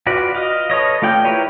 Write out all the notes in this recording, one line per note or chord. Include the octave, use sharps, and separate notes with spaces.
F4 F#4 B4 D5
D#5 F5
A4 B4 C#5 D#5
A3 F4 D5 G5
E4 G4 A#4 B4 C#5